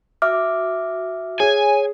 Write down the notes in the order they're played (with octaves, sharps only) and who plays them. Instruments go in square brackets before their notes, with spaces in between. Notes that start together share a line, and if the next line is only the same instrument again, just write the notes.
[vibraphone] F#4 [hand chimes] E5 D6 F6
[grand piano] G#4 [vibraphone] C#5 [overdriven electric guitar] G#5